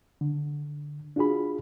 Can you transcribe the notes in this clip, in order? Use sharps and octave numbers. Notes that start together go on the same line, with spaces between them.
D3
D4 F4 F#4 G#4 B5